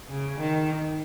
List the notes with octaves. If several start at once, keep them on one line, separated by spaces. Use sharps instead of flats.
C#3
D#3